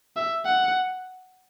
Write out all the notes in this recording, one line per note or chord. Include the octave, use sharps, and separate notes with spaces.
E5
F#5